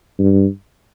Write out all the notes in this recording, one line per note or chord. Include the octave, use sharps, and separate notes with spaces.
G2